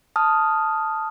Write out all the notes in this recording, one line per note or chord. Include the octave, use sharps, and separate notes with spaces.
A5 D#6 F6